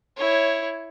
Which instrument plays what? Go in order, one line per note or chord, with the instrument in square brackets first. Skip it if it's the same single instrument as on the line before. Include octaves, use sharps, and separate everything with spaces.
[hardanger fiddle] E4 C#5